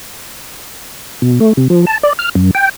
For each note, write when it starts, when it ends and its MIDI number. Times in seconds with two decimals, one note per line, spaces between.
1.22 1.39 47
1.40 1.53 57
1.57 1.68 48
1.70 1.85 53
1.87 1.98 81
2.03 2.13 74
2.19 2.29 89
2.35 2.51 42
2.55 2.69 79